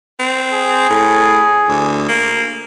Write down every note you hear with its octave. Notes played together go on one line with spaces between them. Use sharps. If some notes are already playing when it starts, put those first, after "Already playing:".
C4
G#4
A2
D2
A#3